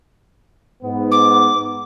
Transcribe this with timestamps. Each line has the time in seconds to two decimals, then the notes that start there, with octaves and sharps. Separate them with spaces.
0.83 G#2 B3
1.11 D6